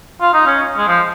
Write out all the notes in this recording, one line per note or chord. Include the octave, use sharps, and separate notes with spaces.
F4
D#4
C#4
G#3
F3